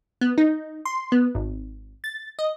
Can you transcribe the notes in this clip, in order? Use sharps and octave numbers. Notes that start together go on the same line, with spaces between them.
B3
D#4
C6
B3
G#1
A6
D#5